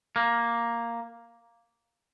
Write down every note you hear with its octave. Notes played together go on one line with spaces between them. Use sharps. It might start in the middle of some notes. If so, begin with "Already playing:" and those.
A#3